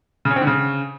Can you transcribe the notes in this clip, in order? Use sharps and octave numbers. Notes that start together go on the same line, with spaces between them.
C#3
C#4
C4
D3
C#3